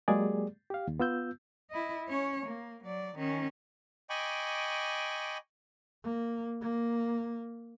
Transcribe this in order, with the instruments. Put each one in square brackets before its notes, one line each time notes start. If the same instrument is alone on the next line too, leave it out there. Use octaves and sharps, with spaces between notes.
[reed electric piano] F#3 G#3 A#3 G4 G#4 D5
G4 F5
D#2
B3 F4 E6 G6
[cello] E4 D#5
C#4 C#5
A#3
F#3 D5
D#3 C#4
[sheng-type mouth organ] D#5 G5 G#5 B5 C#6 D6
[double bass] A#3
A#3